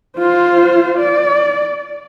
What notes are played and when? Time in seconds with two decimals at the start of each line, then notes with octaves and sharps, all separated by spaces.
0.19 F4 C5
0.98 D5